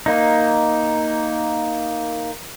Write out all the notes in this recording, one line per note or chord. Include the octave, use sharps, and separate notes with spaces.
A#3 D#4